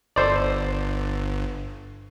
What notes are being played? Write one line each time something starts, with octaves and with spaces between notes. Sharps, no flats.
G1 A4 C5 D5